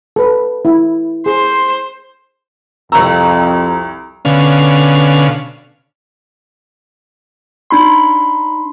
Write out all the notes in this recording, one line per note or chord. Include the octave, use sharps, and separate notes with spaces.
A4 B4
E4
G#4 C5
C2 F2 A#5 C#6 E6
B2 D3 C#4 F5
D4 D#4 B5 C6